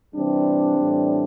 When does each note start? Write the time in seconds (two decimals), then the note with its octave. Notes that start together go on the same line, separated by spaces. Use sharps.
0.15 C3 E3 G3 C4 D4
0.79 A2 E3 G3